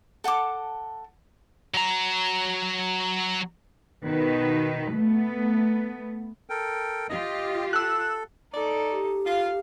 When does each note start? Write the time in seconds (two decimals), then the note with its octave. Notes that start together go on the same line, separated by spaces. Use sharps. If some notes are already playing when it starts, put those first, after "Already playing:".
0.24 A4 F#5 A5 D6
1.74 F#3 A#5
4.06 B2 D#3 B4
4.94 A3 B3
6.50 A4 A#4 G5
7.10 F4 G4 D#5
7.73 A4 E6 F#6
8.54 D#4 A4 D5
8.91 G4
9.26 F4 F5